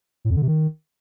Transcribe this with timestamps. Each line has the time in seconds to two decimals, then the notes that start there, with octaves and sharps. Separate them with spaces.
0.25 A2
0.30 F2
0.36 D3
0.42 C3
0.48 D#3